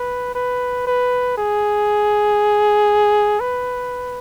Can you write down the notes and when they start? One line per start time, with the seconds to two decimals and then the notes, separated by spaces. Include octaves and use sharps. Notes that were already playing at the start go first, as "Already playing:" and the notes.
Already playing: B4
0.35 B4
0.87 B4
1.37 G#4
3.40 B4